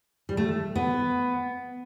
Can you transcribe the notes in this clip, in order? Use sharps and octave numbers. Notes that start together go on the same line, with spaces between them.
G3
A3
B3